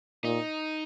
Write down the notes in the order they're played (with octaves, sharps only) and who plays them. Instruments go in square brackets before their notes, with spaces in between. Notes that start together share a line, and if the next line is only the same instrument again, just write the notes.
[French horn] A#2 [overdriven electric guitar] D#4